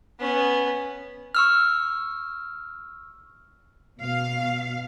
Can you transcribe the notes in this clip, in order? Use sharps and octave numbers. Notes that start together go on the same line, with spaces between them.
B3 C#4
C#6 E6 F6
B2 F5